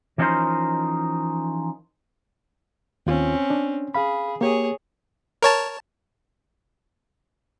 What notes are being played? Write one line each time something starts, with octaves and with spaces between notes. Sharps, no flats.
E3 F3 C#4 D#4 A#4 C5
D#2 C4 C#4 F4
D4
G#4 F5 B5
A#3 G4 G#4 C#5
A#4 C#5 A5